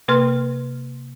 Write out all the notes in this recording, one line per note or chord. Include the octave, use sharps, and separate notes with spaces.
C3 A#3 B4 C6 F6